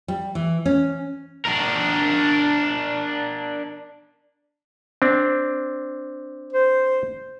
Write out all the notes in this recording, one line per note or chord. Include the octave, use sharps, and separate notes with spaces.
G3
E3
C#4
D4 A#4
C4 D4
C5